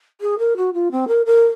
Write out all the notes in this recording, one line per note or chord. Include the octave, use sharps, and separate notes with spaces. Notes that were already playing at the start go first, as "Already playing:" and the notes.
G#4
A#4
F#4
F4
C4
A#4
A#4